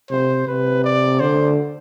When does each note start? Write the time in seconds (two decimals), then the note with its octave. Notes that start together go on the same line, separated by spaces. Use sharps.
0.10 C3 C5
0.47 C3 B4
0.84 D5
1.20 D3 C5